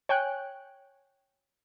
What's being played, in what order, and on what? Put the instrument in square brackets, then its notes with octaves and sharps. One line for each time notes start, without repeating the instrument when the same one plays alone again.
[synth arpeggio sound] C#5 G5 G#5 F#6